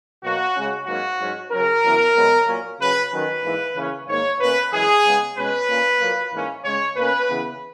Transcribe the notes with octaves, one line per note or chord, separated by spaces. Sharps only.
B2 F#3 A#3 F#4
C#3 G#3 C#4
G#2 F#3 A#3 C#4 F#4
G#2 F#3 C#4
C#3 F#3 C#4 A#4
F#2 C#3 E3 B3
F#2 C#3 G#3 B3
A#2 F#3 A#3 C#4
C#3 F#3 C#4 B4
D#3 F#3 C#4 B4
G#2 E3 A#3
C#3 E3 A#3 C#4
G#2 D#3 A#3 C#5
B2 A#3 C#4 B4
F#2 E3 G#3 G#4
C#3 G#3 B3
B2 G#3 C#4 B4
A#2 A#3 C#4
A#2 F#3 A#3
G#2 E3 A#3 C#4
C#3 G#3 C#4 C#5
B2 A#3 C#4 B4
C#3 E3 B3